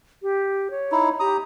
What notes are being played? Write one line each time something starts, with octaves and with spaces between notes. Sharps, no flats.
G4
C#5
D#4 E4
G4 A#5 D#6